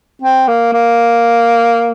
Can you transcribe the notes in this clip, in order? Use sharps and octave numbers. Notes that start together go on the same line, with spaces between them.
C4
A#3
A#3